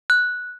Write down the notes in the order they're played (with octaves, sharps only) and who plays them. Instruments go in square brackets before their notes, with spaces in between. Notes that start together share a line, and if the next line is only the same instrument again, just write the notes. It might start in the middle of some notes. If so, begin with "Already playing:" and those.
[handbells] F#6